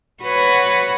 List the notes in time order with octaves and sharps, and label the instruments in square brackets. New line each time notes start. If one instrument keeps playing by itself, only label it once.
[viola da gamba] F#4 B4 C#5